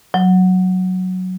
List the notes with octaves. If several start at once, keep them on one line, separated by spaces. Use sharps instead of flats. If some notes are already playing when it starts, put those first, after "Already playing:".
F#3